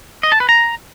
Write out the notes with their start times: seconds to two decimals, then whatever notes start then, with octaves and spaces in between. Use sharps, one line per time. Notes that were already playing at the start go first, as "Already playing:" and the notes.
0.23 D#5
0.32 A5
0.40 B4
0.49 A#5